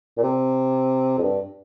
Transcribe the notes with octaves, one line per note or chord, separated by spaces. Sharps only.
A#2
C3
F2
G2